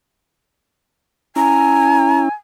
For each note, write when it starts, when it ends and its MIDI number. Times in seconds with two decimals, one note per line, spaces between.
1.36 2.29 61
1.36 2.29 64
1.36 2.32 80
1.36 2.20 82